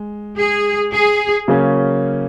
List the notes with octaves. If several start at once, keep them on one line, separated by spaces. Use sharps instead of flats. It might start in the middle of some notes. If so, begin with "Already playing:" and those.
Already playing: G#3
G#4
G#4
C#3 F#3 A#3 C#4